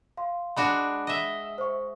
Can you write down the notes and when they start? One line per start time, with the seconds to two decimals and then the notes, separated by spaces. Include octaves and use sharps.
0.17 F5 C6
0.57 G#3 D4 F#4 B5
1.07 D#5 E5
1.58 C5 C#6